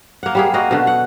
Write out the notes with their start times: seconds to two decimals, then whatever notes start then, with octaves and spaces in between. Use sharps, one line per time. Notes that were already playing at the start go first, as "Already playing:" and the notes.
0.23 A#3 F#5
0.35 G3 A#3 G#4
0.54 A#3 F#4 D#5
0.71 B2 D3
0.87 F#5